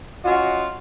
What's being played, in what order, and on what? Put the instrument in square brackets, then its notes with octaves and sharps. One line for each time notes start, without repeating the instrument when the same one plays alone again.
[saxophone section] C#4 F4 F#4 D#5